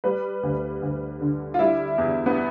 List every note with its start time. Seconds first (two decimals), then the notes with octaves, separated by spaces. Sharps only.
0.04 G3 B4
0.43 D2
0.82 D2
1.21 D3
1.54 F4
1.59 G3 E4
1.98 E2
2.26 B3